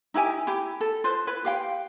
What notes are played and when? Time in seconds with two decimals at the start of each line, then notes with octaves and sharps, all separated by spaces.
0.14 D#4 E4 G4 G#5
0.47 E4 G4
0.80 A4
1.04 F4 B4 C5
1.27 E4 B4
1.45 G4 F5 G5